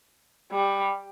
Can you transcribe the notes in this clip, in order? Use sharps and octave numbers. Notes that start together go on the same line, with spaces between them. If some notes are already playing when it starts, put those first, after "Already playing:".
G3